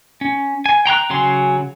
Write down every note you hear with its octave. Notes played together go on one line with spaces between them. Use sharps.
C#4
G#5
G5 A#5 C6 F#6
C#3 F#3 G#5 C6